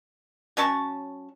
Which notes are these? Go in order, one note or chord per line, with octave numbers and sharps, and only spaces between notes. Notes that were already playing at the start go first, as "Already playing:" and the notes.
F#3 C#4 A5 C#6